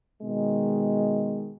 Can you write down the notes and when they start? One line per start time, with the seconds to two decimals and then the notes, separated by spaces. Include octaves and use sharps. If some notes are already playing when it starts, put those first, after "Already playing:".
0.23 B2 D#3 G#3